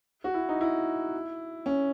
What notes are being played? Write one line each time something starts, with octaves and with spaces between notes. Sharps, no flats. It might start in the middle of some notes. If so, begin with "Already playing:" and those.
F#4
E4
D#4
E4
C#4